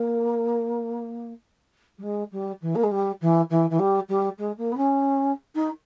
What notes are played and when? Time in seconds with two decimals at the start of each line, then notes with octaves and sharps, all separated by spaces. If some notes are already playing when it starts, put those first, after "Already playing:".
Already playing: A#3
1.98 G3
2.03 G#3
2.32 G3
2.62 E3
2.75 A#3
2.83 G#3
2.91 G3
3.21 E3
3.50 E3
3.70 E3
3.79 G3
4.09 G3
4.38 G#3
4.58 A#3
4.72 B3
4.77 C#4
5.55 D#4